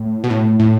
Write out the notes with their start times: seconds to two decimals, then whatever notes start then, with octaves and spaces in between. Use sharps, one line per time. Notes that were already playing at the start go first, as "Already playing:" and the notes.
Already playing: A2
0.24 B2
0.30 A2
0.60 A2